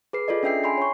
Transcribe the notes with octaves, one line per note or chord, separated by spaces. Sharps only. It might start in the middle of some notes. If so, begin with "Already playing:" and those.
G#4 B4 C7
F4 G#4 A4 D5 D#5
C#4 D4 G#4 E5 G5 C7
G#5 B5 C6 C7
C#5 C#6